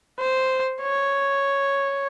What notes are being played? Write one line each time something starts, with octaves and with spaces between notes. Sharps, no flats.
C5
C#5